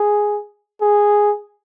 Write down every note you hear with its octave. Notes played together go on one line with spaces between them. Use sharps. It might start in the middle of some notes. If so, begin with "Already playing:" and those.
Already playing: G#4
G#4